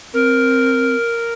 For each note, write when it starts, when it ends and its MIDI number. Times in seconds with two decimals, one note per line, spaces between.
0.14 0.95 60
0.14 1.33 70